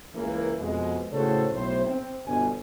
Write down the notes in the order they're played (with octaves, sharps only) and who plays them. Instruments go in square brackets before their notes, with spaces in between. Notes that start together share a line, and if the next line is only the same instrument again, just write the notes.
[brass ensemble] C#2 E3 A#3
F2 B2 G#3
A2 C#3 F#4 A4 C5 C#5
B1 A2 C5
C4
G1 B2 G#5